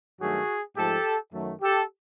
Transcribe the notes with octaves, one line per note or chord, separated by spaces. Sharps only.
G2 D#3 F#3 A3 F#4 G#4
G#2 F3 A3 G4 A4
F#2 D#3 F#3 A3
G4 A4